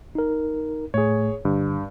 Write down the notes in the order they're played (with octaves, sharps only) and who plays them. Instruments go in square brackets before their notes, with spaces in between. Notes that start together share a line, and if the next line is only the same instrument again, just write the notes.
[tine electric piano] D#4 A#4
[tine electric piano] A2 A3 [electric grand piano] G#4 C#5
[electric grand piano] G2 [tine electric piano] D3